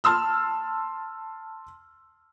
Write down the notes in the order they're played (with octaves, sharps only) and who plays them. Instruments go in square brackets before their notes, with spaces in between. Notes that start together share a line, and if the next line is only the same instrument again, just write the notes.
[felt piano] A5 C6 E6 F6